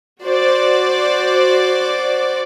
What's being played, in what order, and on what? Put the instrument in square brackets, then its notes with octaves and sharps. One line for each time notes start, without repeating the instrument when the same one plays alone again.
[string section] F#4 C5 D5